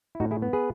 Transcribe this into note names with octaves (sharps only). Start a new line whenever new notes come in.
E4
A2 D#4 F#4
E4 G#4
B3
G#4 B4